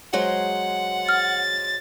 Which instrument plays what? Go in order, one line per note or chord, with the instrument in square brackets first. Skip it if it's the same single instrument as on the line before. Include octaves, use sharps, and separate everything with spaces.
[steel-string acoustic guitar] F#3 G#3 C5 [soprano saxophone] F#5
[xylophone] F6 [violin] A6